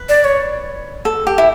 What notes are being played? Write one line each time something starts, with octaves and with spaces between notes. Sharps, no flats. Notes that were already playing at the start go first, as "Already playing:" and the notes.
Already playing: B4
D5
C#5
A4
G4
E4